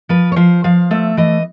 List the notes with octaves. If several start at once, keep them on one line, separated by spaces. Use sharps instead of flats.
F3 B4
C#5
F3 C5
F3 F5
A3 E5
E3 D#5